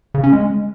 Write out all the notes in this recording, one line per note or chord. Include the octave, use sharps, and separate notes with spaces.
C#3
C#4
G#3